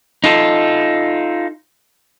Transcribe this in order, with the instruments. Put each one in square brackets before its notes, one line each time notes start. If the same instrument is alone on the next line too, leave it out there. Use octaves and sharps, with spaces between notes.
[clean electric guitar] D#4 F4 A4